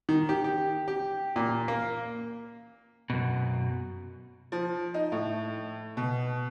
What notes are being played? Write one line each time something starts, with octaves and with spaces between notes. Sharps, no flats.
D#3
G4
G4
G4
A#2
A#3
F#2 B2
F3
D#4
A2
B2